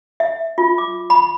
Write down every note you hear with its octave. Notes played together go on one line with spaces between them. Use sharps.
E5
F4
D6
B5